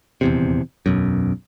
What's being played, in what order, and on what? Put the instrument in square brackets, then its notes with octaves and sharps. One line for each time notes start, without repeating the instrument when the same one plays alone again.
[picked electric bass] D#1 E2 C3
E1 B1 F#2